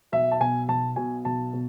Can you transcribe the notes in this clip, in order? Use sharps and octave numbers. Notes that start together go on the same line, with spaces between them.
B1 E5
A5
B2 G#5
B1 A5
B2 G#5
B1 A5
B2